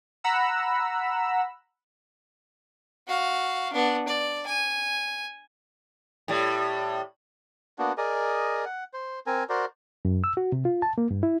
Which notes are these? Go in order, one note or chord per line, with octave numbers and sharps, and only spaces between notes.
F#5 A#5 B5 E6
F#4 F5
B3 D4
D5
G#5
A2 G3
A#3 B3 D4 F#4
G#4 A#4 D5 D#5
F#5
C5
C4 A#4 G#5
F#4 A#4 C5 D5
F#2
E6
F#4
C3
F4
A5
A#3
G2
E4